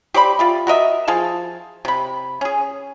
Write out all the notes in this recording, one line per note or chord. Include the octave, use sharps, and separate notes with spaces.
G4 C5 D5 B5
F4 G4 E5
F#4 A#4 D#5 E5
F3 G#4 F5 A5
C3 B5
C#4 G#4